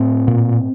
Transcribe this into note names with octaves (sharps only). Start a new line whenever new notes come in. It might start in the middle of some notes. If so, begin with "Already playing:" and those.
Already playing: A2 C4
A#2